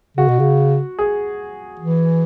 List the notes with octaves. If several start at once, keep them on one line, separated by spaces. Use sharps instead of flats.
C#3 F#4
B2
C#3
G#4
E3